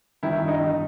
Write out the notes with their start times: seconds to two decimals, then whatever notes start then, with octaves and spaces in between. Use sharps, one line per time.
0.23 D#3 E4
0.42 G2
0.48 D#4
0.60 D#3